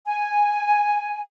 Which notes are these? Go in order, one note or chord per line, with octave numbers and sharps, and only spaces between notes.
G#5